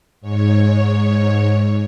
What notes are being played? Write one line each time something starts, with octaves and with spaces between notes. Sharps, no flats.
G#2 C#5